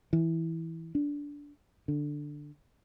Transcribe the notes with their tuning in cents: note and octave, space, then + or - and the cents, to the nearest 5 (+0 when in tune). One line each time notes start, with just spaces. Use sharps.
E3 -10
D4 -15
D3 +5